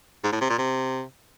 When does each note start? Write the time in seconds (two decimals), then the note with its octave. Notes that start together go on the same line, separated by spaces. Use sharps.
0.24 G#2
0.32 A2
0.41 C3
0.50 A#2
0.58 C3